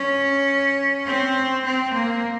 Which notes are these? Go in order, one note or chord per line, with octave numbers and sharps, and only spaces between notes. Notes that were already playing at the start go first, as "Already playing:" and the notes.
Already playing: C#4
C4
C4
A#3